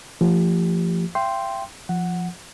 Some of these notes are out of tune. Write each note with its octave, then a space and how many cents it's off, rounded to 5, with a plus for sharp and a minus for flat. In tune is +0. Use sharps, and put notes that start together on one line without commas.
F3 -25 A3 +30 G4 +0
E5 +40 G5 +0 C6 +0
F3 +0 F#5 +0